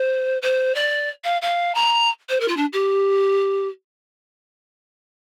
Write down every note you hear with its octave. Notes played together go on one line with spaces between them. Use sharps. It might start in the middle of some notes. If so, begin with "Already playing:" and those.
Already playing: C5
C5
D5
F5
F5
A#5
C5
A#4
F4
D4
G4